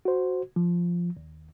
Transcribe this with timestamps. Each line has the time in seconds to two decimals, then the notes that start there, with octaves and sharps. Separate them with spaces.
0.05 F#4 C5
0.56 F3
1.17 D#2